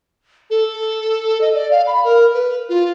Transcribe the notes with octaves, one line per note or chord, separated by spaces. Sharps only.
A4
D#5
D5
F5
B5
A#4
B4
F4